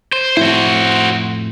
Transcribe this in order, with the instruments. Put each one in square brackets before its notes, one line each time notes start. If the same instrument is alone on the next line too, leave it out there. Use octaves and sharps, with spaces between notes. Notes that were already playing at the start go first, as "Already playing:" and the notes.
[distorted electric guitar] C5
[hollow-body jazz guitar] F2 A2 E4 [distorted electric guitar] F#4 C5